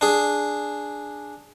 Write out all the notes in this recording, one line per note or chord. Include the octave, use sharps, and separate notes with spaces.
D4 G#4